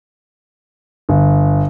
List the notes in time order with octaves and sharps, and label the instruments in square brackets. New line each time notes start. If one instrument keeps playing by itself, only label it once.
[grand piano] G1